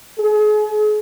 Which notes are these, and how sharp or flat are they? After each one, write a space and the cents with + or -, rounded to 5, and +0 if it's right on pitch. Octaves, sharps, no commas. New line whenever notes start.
G#4 +40